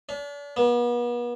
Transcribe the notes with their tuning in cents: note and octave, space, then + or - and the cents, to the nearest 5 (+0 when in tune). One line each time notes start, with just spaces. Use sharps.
D4 -40
B3 -40